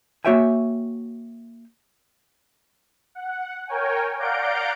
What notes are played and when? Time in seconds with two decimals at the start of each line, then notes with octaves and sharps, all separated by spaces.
0.25 A#3 F#4 C#5 E5 G5 G#5
3.15 F#5
3.68 A#4 C#5 G5 G#5
4.19 D5 F5 F#5 A#5 G6 D7